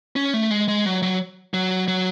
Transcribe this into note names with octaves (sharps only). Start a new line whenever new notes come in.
C#4
A3
G#3
G#3
F#3
F#3
F#3
F#3